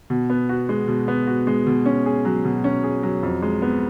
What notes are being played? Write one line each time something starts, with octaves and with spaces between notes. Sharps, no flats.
B2
B3
F#4
G#3
B2
B3
F#4
G#3
B2
C#4
G#4
F#3
B2
C#4
G#4
F#3
F2
G#3
B3